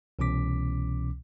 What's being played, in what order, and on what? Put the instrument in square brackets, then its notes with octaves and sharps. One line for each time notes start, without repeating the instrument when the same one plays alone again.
[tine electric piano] C2 B2 E3 C#4 D6 B6